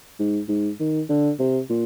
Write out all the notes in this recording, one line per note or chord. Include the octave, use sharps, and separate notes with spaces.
G#2
G#2
D#3
D3
C3
A#2